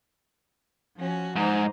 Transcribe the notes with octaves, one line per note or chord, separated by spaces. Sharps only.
F3 C#4 F#4
G#2 D#4 C5